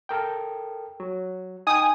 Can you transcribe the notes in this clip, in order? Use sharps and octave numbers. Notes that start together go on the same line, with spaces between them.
A4 A#4 G5
F#3
D#4 G5 G#5 D#6